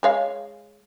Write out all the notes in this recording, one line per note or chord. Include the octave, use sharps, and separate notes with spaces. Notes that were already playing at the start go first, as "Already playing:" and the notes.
G#3 C#5 F5